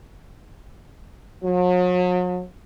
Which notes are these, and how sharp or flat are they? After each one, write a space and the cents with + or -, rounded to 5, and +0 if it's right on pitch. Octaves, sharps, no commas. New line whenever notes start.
F#3 -45